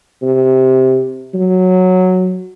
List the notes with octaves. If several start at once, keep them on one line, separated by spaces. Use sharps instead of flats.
C3
F#3